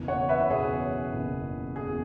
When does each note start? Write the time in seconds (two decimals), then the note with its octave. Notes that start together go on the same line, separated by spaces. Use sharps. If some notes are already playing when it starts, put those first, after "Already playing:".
Already playing: F#1 E2 B2
0.08 C#5 F#5
0.29 B4 E5
0.50 F#1 E2 B2 G#4 C#5
1.13 F#1 E2 B2
1.76 E2 B2 G#4